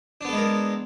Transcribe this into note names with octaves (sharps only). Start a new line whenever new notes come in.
G#3 B3 D4 A4 A#4